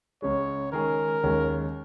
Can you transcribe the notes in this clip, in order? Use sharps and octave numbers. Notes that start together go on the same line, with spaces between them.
C#2 C#3 G#3 C#5
D#3 G#3 C#4 G#4 A#4
D#2 D#3 G#3 C#4